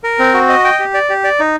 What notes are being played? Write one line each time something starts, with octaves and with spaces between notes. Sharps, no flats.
A#4
C4
F#4
D#5
G5
G4
D5
G4
D5
D#4